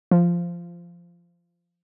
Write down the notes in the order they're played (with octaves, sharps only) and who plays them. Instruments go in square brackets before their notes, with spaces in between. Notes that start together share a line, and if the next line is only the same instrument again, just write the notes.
[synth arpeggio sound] F3